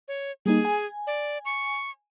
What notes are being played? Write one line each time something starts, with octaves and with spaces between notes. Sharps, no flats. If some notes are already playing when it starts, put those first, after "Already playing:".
C#5
G3 A#3 D#4 G#4
G#5
D5
C#6